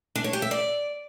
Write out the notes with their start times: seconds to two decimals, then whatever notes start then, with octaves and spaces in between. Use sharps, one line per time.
0.15 D4
0.24 C#5
0.33 G4
0.42 E5
0.51 D5